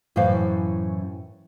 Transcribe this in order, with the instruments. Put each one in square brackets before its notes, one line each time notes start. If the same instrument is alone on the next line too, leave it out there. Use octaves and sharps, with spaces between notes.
[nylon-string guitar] F#2 A2 E3 C#4 C5 F5